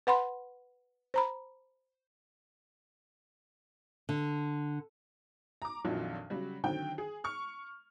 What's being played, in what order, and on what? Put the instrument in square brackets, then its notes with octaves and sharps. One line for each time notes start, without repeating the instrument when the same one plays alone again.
[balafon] B4 F#5 B5 C6
C5 A#5 B5
[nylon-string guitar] D3
[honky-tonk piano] A#5 D6
A#1 F2 A#2 D#3 F#3
C#3 F#3 G3
D3 D#3 F#3 C4 G5
G#4
C#6 F6